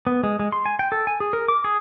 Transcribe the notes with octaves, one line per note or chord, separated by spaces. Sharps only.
B3
G#3
G#3
C6
G#5
G5
A4
G#5
G#4
A#4
D6
G#4